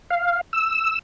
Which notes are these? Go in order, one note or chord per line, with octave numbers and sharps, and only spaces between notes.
F5
E6